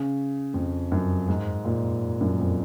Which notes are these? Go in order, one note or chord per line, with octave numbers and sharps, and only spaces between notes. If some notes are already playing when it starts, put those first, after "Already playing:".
Already playing: C#3
F2
F#2
G#2
A#2
F#2
F2